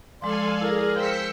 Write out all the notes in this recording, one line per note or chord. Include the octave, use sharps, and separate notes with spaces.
F3 G#3 A4 D5 F5 G#5 C6
E4 G#4 A#4
C5 F5 G5 E6 B6 C#7